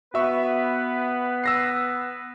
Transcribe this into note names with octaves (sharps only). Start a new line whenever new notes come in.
B3 F#4 B4 E5 C#6
E6 A#6 C7